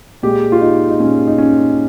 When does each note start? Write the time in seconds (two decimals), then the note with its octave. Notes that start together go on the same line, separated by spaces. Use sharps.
0.23 A#2 G#3 G4
0.52 F4
0.61 D#4
0.90 D#4
1.00 A#2 G#3 C#4
1.27 D#4
1.38 C#4